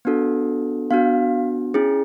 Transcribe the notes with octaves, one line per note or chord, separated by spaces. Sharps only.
B3 D4 F#4 A4
B3 D4 F#4 F5
C#4 E4 G#4